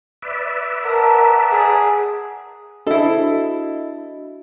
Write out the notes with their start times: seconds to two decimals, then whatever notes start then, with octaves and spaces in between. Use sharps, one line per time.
0.22 B4 D5 E5
0.84 A#4 F#5 A5 A#5
1.52 G#4
2.87 D4 E4 F#4 A4 D#5